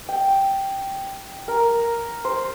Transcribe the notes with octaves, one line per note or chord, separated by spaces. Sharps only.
G5
A#4
C5